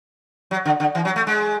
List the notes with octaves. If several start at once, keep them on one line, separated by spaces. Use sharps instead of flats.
F#3
D3
D3
E3
F#3
A3
G#3